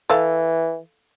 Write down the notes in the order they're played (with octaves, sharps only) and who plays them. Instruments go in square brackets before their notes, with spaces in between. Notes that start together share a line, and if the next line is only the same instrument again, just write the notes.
[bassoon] E3 [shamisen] A4 F5